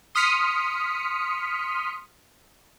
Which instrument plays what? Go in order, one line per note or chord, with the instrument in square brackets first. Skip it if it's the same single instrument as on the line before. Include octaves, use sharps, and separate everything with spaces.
[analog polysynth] C6 D#6 F6 B6 C#7